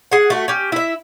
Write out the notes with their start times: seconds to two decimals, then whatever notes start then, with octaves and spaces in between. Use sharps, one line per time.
0.12 G#4 F#5
0.30 A3 F#4
0.48 C#4 G4
0.72 E4 E5